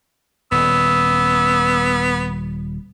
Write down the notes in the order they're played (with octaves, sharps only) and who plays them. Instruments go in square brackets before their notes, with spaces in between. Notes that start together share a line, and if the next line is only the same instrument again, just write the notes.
[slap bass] D#1 [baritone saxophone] B3 [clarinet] E6